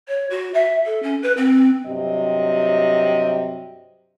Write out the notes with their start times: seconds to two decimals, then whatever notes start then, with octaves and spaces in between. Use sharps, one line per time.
0.08 C#5
0.30 F#4
0.54 E5
0.85 A4
1.03 C#4
1.22 B4
1.37 C4
1.86 G2 C3 F#3 D#5